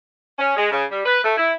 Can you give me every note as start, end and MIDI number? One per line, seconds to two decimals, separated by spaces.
0.39 0.56 61
0.56 0.70 56
0.72 0.84 49
0.91 1.02 55
1.06 1.20 71
1.24 1.34 57
1.37 1.52 64